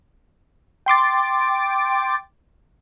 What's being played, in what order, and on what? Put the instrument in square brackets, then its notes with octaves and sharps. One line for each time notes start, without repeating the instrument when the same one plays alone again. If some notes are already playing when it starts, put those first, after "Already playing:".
[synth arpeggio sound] G5 C6 D6 A6